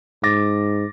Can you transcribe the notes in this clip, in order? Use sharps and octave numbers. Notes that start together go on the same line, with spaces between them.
G#2 D6 A6 A#6